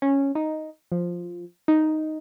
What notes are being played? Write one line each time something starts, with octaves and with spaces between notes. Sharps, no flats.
C#4
D#4
F3
D#4